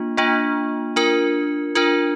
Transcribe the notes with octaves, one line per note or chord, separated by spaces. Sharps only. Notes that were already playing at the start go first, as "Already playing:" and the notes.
Already playing: A#3 D4 F4
A#3 D4 F4
D4 F4 A#4
D4 F4 A#4